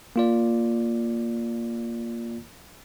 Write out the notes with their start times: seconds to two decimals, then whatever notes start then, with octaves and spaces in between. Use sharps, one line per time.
0.16 A#3 F4 D5